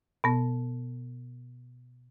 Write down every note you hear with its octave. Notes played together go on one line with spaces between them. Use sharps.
B2 B3